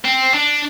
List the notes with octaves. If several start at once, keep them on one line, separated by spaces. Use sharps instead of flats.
C4
D4